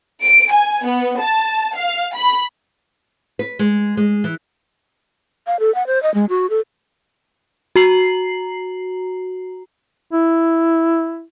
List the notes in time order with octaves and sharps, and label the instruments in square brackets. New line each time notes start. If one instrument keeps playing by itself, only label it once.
[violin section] D7
G#5
B3
A5
F5
B5
[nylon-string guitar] B4
G#3
G#3
E3
[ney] F5
A4
F#5
C5
D#5
G#3
F#4
A4
[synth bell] F#4 A#5 C7 F#7
[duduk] E4